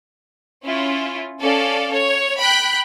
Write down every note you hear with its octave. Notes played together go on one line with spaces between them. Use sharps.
C#4 E4 F4
C#4 A4 D5 F5
C#5
G5 B5 F#6